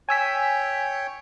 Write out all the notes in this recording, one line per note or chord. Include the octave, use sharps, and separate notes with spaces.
C#5 G5 G#5 E6 B6